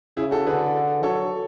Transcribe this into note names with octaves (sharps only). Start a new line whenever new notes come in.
C#3 E4 G#4
F#4 A4
D3 G#4 B4
F#3 A4 C#5